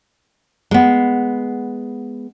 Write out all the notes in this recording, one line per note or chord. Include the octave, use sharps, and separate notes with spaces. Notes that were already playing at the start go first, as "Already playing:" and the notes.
G#3 B3